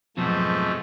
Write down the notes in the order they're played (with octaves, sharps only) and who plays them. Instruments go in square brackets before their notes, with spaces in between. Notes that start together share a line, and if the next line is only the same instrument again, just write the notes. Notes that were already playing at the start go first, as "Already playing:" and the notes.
[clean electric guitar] F2 B2 F#3 [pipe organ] G#2 F3 A3